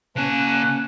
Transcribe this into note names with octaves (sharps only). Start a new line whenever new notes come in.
C#3 A#3 C#4 A5 F#6